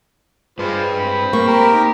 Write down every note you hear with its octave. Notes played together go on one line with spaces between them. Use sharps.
G2 G#3 F4 B4 C5
C4 C5 B5
A#3 C#6
G4 A#4
D#4 C6